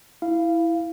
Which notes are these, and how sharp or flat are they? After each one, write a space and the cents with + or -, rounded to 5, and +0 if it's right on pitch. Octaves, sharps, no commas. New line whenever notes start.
E4 +0 F5 -15